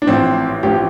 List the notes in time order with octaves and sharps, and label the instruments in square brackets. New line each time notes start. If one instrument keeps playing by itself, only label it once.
[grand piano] D4
[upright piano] A1 A2 F3 [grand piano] C4
[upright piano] A1 A2 F3 [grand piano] G4